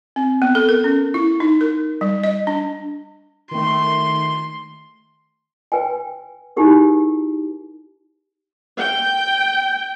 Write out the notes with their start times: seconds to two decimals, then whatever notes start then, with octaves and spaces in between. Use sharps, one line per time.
0.16 C4
0.42 B3
0.55 A4
0.69 A#4
0.84 C#4
1.14 E4
1.40 D#4
1.61 A#4
2.01 G3
2.24 D#5
2.47 D4
3.51 D#3 A3 C6
5.72 B4 G5 G#5
6.56 D#4 E4 G4 G#4 A#4
8.78 G5